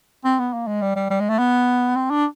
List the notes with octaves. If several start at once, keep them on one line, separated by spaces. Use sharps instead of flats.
C4
B3
A#3
G#3
G3
G3
G3
G#3
A3
B3
C4
D4